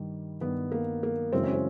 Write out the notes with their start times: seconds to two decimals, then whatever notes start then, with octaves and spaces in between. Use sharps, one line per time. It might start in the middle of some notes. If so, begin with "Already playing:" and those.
Already playing: G2 D#3 G3
0.41 G2 D#3 G3 B3
0.72 A#3
1.03 A#3
1.33 F#2 C#3 E3 G#3 C4
1.44 C#4
1.54 C4